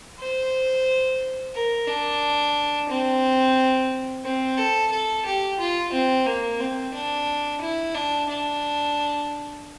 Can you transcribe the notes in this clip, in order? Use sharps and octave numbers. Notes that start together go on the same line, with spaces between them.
C5
A#4
D4
C4
C4
A4
A4
G4
F4
C4
A#3
C4
D4
E4
D4
D4